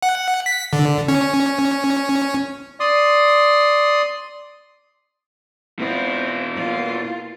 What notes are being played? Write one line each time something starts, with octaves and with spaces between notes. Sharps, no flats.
F#5
B6
D3
C#4
D5 C6 D#6
B2 C4 E4 F4
A#3 F4